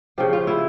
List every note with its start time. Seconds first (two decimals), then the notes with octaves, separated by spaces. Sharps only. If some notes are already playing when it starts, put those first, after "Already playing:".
0.18 C#3 F3 G4
0.33 F4
0.47 E4